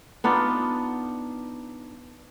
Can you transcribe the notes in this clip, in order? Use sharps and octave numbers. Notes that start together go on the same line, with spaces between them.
B3 D4 D#4 F4